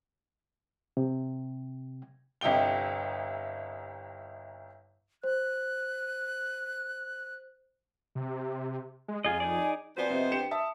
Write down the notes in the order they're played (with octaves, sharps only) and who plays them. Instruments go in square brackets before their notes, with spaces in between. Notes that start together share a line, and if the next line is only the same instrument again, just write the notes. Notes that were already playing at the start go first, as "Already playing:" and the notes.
[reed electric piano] C3
[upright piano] G1 C2 D#5 G5 G7
[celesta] C5 [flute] F#6
[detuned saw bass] C3
G#3
[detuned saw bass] F2 [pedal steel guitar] F4 G#4 D#5 [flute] G#5
[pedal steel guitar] D#4 G#4 D5
[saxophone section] F2 B3 C5 [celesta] F#4 D5 G#5
[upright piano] C3 [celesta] D#5 E5
[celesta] D4 [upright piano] G4 C#7 E7
[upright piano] E5 A5 [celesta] D#6